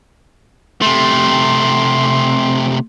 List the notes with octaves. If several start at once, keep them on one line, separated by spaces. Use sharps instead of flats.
C3 A3 C6